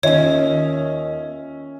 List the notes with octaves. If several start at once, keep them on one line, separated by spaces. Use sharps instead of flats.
D#2 D#3 C#4 F4 C#5 D#5 E5